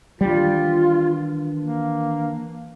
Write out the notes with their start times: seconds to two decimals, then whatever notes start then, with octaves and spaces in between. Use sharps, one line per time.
0.21 D#3 E3 G3 D4 F4
1.60 A#3